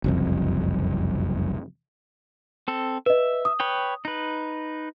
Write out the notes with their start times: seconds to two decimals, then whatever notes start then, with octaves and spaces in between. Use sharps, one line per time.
0.04 F#1 C2 F2
2.68 C4 A4
3.06 B4 D#5 E5
3.45 D#6
3.60 B4 C#5 G5
4.05 D#4 B4